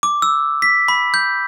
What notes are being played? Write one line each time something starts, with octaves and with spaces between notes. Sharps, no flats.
D6
E6
B6
B5
G6